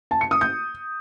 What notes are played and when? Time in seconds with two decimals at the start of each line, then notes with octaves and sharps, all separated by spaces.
0.11 A5
0.21 C#7
0.31 D#6
0.41 G6